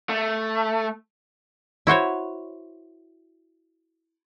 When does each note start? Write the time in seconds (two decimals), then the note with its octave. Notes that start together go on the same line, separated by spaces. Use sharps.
0.09 A3
1.87 E4 F#4 C5 C#5